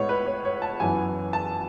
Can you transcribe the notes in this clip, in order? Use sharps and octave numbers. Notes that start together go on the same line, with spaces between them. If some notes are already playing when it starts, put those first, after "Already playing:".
Already playing: A2 G#3 B3 C#5
B4
C#5
C#5
A5
F#2 E3 B3 G#5
A5